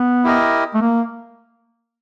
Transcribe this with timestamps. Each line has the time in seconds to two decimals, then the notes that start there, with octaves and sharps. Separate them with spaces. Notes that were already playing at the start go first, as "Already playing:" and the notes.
Already playing: B3
0.24 E4 G4 A#4 D#5
0.74 A3
0.81 A#3